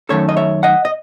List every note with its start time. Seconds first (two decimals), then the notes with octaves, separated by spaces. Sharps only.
0.09 F#2 D#3 A3 C#4 A4 C#5
0.29 D#5
0.37 C#5 E5
0.63 D#5 F#5
0.85 D#5